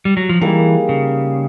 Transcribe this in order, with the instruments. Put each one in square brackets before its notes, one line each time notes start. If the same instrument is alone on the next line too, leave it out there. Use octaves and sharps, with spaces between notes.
[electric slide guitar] G3
F#3
F3
[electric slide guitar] E3 [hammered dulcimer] G3 A#3 D#4 G#4
[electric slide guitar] C#3